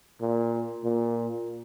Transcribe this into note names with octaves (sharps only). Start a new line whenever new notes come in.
A#2
A#2